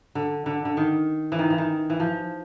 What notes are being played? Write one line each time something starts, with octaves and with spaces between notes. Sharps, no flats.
D3
D3
D3
D#3
E3
D#3
E3
D#3
E3
F3